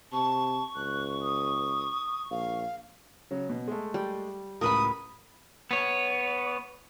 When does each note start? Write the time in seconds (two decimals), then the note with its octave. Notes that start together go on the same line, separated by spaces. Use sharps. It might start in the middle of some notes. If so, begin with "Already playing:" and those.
0.12 C3 A5 C#6
0.76 C#2 F#6
1.21 D#6
2.31 A#1 F5
3.31 C#3 F#3
3.49 B2
3.68 G#3 A3
3.94 G3
4.61 C#2 A2 A#4 B4 B5 D#6
5.71 B3 C#5